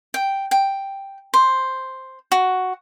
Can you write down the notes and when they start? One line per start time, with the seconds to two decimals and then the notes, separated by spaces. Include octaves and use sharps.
0.14 G5
0.51 G5
1.34 C5
2.32 F#4